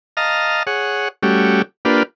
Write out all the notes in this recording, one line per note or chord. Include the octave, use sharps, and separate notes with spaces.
D#5 F5 A5 A#5
G#4 C#5 F#5
G3 A3 C#4 F#4 G4
A#3 D4 F4 G4 B4